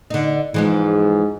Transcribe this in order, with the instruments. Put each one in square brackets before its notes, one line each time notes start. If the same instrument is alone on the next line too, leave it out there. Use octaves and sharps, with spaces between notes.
[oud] D3 D#4
[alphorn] G#2 [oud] E3 F3 G#3